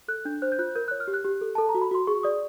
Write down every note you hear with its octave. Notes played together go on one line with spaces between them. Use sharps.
A4 F#6
D4 G6
C5 F#6
G6
F4 F#6
A#4 G6
C#5 F#6
F6
G4
F#6
G4
A4
A4 A5
A#5
F#4
B5
F#4 C6
G#4 C#6
D5 D#6